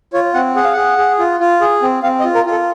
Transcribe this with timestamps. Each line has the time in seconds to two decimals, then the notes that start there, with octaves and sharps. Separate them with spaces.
0.13 F4 C#5
0.34 C4 F#5
0.56 G#4 F#5
0.65 F5
0.73 G#4 F#5
0.98 G#4
1.19 F4
1.40 F4
1.61 G#4
1.82 C4
2.03 C4 F5
2.20 D#5
2.24 F4
2.35 A#4
2.46 F4
2.51 A4